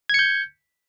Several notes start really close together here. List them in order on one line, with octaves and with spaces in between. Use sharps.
G#6 C#7 G6